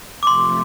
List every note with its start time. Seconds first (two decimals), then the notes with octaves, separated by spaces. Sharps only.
0.23 D6
0.27 C3 F3 A3 C6